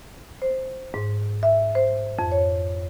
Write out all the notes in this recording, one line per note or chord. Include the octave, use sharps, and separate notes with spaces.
C5
G#2
E5
C5
F2
C#5